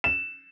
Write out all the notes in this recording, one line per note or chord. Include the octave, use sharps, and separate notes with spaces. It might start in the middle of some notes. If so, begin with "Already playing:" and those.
E7